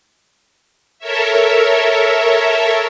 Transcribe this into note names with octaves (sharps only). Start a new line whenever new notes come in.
A4 A#4 C#5 E5